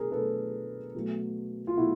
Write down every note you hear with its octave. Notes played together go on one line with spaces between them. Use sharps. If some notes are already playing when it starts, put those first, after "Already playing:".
Already playing: B2 F#3 A3 D4 G#4 A#4
B2 F#3 A3 D4 A4 B4
B2 F#3 A3
F4
B2 F#3 A3 E4 F#4